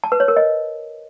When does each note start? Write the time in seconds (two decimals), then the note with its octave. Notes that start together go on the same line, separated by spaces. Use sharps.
0.04 A5
0.12 B4
0.20 C#5
0.28 A#4
0.36 D#5